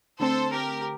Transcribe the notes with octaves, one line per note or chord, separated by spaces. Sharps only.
D3 A3 C4 A4 C5
G4 A#4